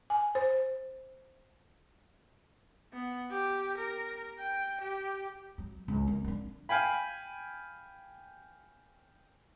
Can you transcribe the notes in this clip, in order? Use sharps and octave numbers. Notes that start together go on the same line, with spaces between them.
G#5
C5
B3
G4
A#4
G5
G4
F#3
C#2
A#3
B3 D4
F5 G5 G#5 B5